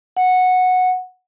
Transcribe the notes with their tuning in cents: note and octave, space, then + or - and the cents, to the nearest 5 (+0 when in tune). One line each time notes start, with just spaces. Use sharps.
F#5 -10